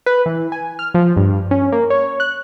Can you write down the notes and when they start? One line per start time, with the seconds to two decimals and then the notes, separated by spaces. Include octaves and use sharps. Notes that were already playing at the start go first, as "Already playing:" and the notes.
0.06 B4
0.26 E3
0.52 G#5
0.79 F6
0.94 F3
1.17 G2
1.51 C#4
1.72 A#3
1.90 C#5
2.20 F#6